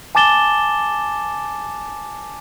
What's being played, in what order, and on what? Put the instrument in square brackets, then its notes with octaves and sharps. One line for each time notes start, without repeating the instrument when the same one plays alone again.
[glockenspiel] G#5 A5 D6 A6 E7 G7